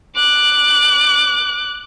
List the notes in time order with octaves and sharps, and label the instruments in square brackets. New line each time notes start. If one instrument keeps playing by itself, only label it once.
[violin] D6 F#6